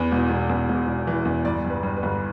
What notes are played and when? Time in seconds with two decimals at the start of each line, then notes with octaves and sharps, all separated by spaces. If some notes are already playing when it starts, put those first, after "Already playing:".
Already playing: E2 B4
0.12 E1
0.30 E1
0.50 E2
0.69 E1
0.87 E1
1.07 E3
1.25 E2
1.45 G1 D5
1.65 G2
1.70 B4
1.83 G2
1.97 B4
2.03 G1